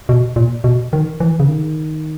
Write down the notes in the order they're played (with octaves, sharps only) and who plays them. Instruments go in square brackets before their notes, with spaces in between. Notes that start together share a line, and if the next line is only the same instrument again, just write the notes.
[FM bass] B2
A#2
B2
D#3
E3
C#3
D#3